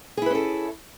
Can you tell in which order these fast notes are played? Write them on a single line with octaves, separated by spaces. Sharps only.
G#4 E4 B4 C#4 A4